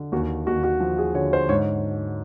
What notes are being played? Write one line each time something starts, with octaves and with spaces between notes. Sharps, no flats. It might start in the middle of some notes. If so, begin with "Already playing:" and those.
Already playing: D3
D#2 F#4
D#2 F#4
F#4
F3
G#4
D3 C#5
C5
G#2 C#5